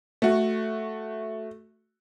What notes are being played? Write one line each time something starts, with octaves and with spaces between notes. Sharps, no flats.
A3 F#4